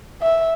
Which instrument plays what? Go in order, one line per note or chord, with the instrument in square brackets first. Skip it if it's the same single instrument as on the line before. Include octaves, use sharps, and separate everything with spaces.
[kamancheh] E5